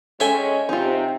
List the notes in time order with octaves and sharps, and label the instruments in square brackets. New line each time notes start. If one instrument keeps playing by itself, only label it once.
[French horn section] G#3 C#4 [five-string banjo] A4 C#5 [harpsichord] E5 G5 G#5
[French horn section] C3 [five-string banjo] D#4 F4